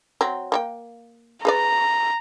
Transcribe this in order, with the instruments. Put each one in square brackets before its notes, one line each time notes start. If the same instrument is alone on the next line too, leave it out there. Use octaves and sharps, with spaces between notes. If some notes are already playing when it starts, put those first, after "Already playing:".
[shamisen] F#3 C4
A#3 C#5 G5
[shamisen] G#4 B4 D5 [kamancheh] A#5